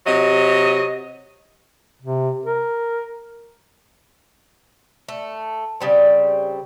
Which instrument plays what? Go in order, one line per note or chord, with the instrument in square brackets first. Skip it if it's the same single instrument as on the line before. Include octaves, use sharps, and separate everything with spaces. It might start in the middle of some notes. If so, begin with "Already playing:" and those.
[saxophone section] C3 F#3 D#5
[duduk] C3
A#4
[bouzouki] A3
C#3 G3 C4